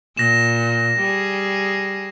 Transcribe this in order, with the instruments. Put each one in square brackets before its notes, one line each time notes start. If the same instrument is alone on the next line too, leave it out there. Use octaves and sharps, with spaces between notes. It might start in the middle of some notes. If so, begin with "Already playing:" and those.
[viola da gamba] A#2 [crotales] A#6 E7
[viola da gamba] G3 G#4